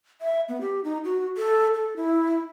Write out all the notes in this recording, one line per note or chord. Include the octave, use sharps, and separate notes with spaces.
E5
B3
G4
D#4
F#4
A4
A4
E4